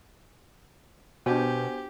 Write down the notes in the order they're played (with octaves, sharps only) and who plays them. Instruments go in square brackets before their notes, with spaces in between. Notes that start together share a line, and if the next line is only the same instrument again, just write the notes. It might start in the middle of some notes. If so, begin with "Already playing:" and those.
[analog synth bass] B2 [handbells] B3 C5 G#5 [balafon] D4 F#4 [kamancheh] G4